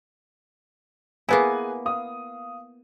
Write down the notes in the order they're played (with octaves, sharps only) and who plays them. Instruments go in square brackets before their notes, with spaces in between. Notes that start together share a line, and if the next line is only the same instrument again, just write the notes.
[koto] A#3 B3 E4 [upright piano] G#4 B4 G#5
[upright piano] F5 D#6